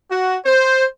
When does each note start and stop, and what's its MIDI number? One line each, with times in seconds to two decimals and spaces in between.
0.11 0.37 66
0.46 0.85 72